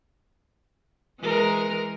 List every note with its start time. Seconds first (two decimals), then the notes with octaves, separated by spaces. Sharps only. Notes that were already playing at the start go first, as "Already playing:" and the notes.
1.20 E3 G#3 A#4